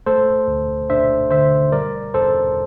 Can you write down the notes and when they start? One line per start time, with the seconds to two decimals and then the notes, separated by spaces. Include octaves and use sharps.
0.06 A3 A4 C5
0.48 D2
0.90 D4 C5 E5
1.31 D3 C5 E5
1.72 G3 A#4 D5
2.14 E2 A4 C5